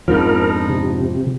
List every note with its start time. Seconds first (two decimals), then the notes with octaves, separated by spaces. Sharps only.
0.08 F2 G#2 F3 B3 D4 D#4 A#4
0.70 C3